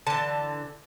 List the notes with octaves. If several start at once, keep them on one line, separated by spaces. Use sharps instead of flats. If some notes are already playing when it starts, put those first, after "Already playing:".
D3 E3 A5